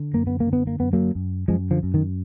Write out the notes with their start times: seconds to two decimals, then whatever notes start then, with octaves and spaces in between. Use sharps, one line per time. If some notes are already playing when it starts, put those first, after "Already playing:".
Already playing: D3
0.14 F#2 A#3
0.27 B3
0.40 A#3
0.47 D3
0.53 B3
0.67 A#3
0.80 F#2 B3
0.93 F#3 A#3
1.15 F#2
1.48 F#2 F3 G#3
1.71 D3 F3
1.83 F#2
1.94 D#3